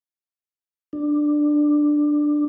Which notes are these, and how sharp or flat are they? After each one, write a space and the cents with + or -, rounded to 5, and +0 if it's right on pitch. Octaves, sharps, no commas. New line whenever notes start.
D4 +10